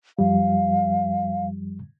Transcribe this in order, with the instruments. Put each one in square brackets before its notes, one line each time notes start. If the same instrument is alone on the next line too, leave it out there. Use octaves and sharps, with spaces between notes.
[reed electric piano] F#2 F3 G3 [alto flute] F5